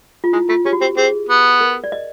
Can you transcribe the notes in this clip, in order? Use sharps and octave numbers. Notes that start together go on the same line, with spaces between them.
F4
G#3 E4
A3 F4
C#4 G4
F#4
C4 G4
C4 G#4
B3
A#4
D5
D#5